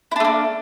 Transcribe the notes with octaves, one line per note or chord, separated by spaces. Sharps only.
A3 A#3 D4 E4